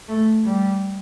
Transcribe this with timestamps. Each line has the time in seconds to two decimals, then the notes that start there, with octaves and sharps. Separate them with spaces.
0.08 A3
0.45 G3